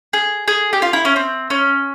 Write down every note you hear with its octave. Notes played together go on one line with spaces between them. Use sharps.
G#4
G#4
G4
F4
E4
C#4
C4
C#4